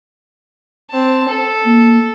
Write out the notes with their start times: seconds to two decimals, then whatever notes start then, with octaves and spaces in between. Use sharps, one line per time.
0.91 C4 A5
1.29 A4
1.65 A#3